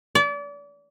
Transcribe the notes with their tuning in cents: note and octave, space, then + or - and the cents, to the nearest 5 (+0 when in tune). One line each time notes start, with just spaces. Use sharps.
D5 -35